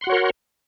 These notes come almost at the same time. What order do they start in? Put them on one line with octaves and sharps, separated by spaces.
C6 F#5 F#4 C#5 A#4